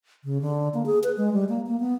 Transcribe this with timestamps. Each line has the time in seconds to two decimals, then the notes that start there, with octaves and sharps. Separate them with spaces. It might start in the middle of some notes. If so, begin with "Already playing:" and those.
0.24 C#3
0.42 D3
0.74 A#3
0.86 G#4
1.04 B4
1.17 G#3
1.33 G3
1.49 A#3
1.67 A#3
1.80 B3